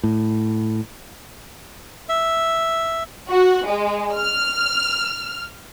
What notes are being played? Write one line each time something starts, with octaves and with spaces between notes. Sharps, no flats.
A2
E5
F#4
G#3
F6